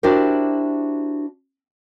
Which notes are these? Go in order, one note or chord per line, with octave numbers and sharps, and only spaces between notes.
D4 E4 F#4 G4 A#4 C5